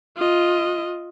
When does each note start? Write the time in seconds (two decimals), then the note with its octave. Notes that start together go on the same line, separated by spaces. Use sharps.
0.17 F4 D#5